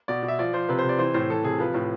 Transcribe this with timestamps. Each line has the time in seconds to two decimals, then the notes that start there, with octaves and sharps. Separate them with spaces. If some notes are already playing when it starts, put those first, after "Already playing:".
0.08 B2 D5
0.23 B2
0.28 E5
0.39 F3 D5
0.53 F3 C5
0.69 C3 B4
0.79 C5
0.84 C3
0.89 D5
0.99 E3 C5
1.14 A2 C5
1.30 E3 A4
1.44 C3 G#4
1.59 F3 B4
1.74 A2